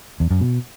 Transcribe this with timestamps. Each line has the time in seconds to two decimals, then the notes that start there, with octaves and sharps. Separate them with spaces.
0.20 E2
0.31 F#2
0.41 B2